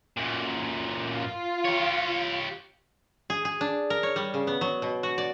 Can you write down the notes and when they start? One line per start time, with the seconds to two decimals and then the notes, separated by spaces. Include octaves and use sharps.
0.17 F#2 A#2
1.12 F4
1.65 G4 C#5
3.30 G#4
3.45 G#4
3.61 D4
3.90 A#4
4.03 C#5
4.16 G3
4.34 C#3
4.47 B3
4.61 F#3
4.82 B2
5.03 F#4
5.18 D5